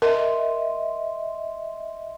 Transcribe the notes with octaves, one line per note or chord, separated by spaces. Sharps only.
A#4 D#5 E5 C6